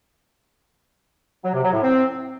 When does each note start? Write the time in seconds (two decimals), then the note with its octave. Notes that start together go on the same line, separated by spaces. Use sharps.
1.44 F#3
1.53 C3
1.63 F#3
1.73 A2
1.82 C4